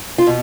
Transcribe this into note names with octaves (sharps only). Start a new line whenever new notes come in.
F4
B2